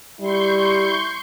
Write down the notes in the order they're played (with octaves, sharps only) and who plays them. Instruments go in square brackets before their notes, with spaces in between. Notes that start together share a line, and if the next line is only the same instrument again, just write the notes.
[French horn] G3 [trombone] E4 [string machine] C6 C#6 G6